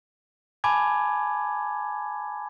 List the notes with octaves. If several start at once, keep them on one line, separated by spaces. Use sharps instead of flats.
G#5 A5 B5 D6 G#6